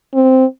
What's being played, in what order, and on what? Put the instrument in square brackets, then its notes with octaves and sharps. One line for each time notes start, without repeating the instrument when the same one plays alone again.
[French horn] C4